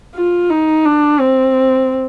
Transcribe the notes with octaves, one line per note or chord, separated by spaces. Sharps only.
F4
D#4
D4
C4